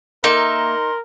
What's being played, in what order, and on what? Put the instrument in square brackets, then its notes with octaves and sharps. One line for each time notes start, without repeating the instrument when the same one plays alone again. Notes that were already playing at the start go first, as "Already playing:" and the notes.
[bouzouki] A#3 E5 [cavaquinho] D#4 [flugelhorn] A#4 [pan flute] C6